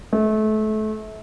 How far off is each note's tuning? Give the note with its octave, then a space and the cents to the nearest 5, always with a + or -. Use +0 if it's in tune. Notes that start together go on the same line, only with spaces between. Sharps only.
A3 -30